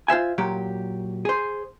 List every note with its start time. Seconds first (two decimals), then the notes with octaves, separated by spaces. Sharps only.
0.08 F4 C5 E5 G#5
0.38 A#2 F#3 G4
1.25 G#4 C5